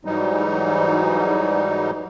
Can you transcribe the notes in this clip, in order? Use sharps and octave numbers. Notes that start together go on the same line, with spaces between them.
G#2 E3 F#3 G3 D#4